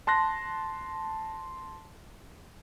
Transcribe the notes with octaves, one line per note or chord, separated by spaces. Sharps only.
A5 C6 F#6 A#6